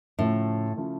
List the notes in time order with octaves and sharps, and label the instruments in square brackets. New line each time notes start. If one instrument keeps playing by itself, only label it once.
[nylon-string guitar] A2 [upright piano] C#3 F3 A3
[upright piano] C#3 F3 A3